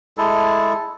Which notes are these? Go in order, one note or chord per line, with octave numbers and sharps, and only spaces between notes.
G#3 E4 A4